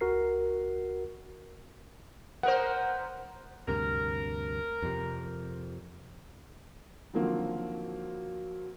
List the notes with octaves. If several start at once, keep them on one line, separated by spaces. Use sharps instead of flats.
C#2 F#4 A#4 C7
B3 A#4 C5 F#5
D2 G2 C3 A#4
F2 C3
D3 D#3 F3 F#3 A#3 C4